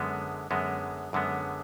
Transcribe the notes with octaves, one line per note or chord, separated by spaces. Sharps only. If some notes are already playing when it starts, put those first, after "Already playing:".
Already playing: F#2 D3 G#3 B3
F#2 D3 G#3 B3
F#2 D3 G#3 B3